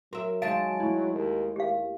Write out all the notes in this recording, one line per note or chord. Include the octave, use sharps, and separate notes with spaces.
F#3 F#4 A#4 E5
D#3 G#3 G#4 F5 A5 A6 D7
A3 E4
D#2
D#2 G4 F5